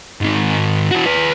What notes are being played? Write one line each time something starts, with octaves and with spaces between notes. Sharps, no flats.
G#2 D#3
E3 F#4
G#4 B4